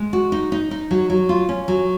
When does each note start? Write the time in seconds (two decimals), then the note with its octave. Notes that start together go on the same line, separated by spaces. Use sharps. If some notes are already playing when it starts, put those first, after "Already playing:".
Already playing: G#3
0.13 F#4
0.32 D#4
0.52 D#4
0.71 D#4
0.91 F#3
1.10 F#3
1.29 F4
1.49 C#4
1.68 F#3